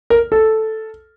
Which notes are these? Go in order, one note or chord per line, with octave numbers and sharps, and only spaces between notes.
A#4
A4